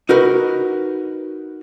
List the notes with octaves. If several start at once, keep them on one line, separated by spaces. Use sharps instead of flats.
D#4 F#4 A#4 B4